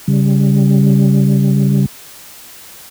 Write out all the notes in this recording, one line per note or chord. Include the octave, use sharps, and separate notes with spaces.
C#3 G3